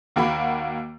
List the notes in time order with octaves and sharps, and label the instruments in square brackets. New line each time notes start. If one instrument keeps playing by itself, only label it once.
[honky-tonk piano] D#2 A#3 F#4 B5